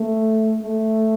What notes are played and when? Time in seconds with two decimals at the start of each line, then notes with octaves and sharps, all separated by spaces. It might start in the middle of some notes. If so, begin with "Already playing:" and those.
Already playing: A3
0.62 A3